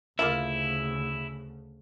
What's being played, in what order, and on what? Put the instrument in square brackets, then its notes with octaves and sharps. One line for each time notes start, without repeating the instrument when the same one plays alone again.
[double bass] D2 C#3 [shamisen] A#3 F4 E5 [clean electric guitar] E4